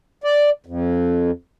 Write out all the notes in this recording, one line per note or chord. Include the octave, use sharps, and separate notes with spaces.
D5
F2